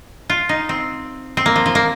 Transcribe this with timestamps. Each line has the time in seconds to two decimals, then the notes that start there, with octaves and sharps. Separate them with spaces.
0.30 F4
0.49 D#4
0.69 C4
1.37 C4
1.46 A#3
1.56 F3
1.66 F3
1.75 A#3